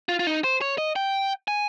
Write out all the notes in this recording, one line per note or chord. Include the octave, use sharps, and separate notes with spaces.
F4
F4
D#4
C5
C#5
D#5
G5
G#5